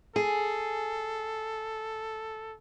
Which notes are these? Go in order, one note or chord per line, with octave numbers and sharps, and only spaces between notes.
G#4 A4